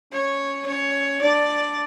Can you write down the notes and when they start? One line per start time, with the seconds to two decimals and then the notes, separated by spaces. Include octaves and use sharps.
0.12 C#4 C#5
0.67 C#4 C#5
1.22 D4 D5